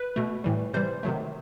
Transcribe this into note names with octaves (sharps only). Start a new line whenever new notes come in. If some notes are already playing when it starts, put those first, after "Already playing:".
Already playing: B4
B2 A3
A2 E3 G3
C3 E3 G3 C5
C3 D#3 F#3 A3